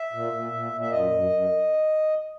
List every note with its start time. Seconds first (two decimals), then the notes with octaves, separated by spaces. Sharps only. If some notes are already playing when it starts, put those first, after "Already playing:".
Already playing: E5
0.13 A#2
0.33 A#2
0.52 A#2
0.72 A#2
0.81 E5
0.91 F#2 D#5
1.11 F#2
1.30 F#2